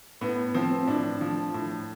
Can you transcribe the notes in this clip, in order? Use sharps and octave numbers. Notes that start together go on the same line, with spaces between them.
A2 B3
F3 C4
A2 D4
F3
A2